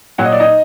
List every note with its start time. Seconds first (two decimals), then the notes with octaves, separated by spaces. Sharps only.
0.18 A#2 F#3 F#5
0.25 D#5
0.32 D5
0.39 D#4 D#5